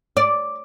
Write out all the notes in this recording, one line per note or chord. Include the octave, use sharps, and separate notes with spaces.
D5